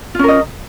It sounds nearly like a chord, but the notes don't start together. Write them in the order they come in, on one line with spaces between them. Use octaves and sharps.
F4 C#4 A#4 D#5